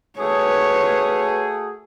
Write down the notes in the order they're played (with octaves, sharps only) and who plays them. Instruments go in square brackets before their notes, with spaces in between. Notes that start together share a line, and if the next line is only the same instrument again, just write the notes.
[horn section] A3 F#4 G#4 [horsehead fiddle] B4 C#5